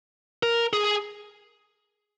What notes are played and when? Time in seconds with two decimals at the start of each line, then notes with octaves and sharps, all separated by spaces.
0.43 A#4
0.73 G#4